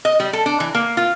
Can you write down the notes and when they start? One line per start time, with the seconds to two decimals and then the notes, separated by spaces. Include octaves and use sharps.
0.05 D#5
0.20 G3
0.33 A4
0.46 D4
0.60 E3
0.75 A#3
0.97 F4